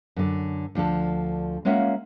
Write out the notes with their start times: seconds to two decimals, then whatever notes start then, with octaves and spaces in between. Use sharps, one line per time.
0.16 F#2 D3
0.75 D2 F3 D4 A4
1.65 G#3 A#3 C#4 F4 E5 F#5